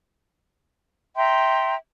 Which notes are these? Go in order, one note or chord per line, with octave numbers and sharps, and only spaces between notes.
E5 G5 A#5 C6